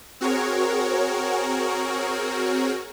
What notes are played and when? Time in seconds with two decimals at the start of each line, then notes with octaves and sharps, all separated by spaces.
0.21 C4 F#4 G#4 A#4 C#5